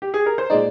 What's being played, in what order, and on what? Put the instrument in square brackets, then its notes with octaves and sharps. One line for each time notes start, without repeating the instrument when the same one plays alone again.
[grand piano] G4
G#4
A#4
C5
[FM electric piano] A#2 G#3 D#4 [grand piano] D5